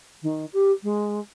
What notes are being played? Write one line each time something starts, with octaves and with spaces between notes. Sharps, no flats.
D#3
G4
G#3